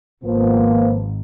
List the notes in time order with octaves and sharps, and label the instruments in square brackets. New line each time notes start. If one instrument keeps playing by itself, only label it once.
[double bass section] G#1 [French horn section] F3 A#3 B3